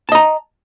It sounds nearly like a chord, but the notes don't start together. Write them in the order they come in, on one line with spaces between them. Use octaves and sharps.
A5 D#5 A#5